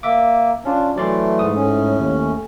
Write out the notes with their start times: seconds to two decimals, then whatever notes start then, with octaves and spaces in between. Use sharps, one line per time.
0.03 A#3 E5 D6
0.65 C#4 D4 F4
0.96 E3 F#3 A3 D5 C6
1.39 G#2 D#6
1.55 A2 C#4
2.00 D#2